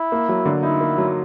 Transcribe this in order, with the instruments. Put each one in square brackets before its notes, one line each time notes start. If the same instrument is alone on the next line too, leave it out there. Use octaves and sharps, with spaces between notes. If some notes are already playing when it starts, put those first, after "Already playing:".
Already playing: [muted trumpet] E4
[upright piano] A#3
F#3
D3
[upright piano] D#4 [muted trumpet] E4
[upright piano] A#3
F#3